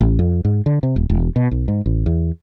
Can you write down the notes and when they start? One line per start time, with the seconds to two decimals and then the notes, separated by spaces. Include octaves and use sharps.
0.01 A1
0.19 F2
0.45 G#2
0.66 D3
0.83 C3
0.96 D#1
1.10 E1
1.36 B2
1.51 B1
1.68 G#2
1.86 A1
2.06 E2